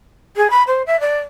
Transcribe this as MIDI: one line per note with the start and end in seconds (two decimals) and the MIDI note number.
0.36 0.50 68
0.50 0.63 83
0.67 0.83 72
0.87 1.00 76
1.00 1.20 74